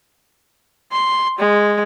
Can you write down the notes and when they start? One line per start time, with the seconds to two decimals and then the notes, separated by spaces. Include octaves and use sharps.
0.92 C6
1.39 G#3